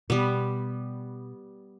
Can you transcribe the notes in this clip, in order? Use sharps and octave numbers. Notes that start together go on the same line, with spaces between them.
B2 G3 B3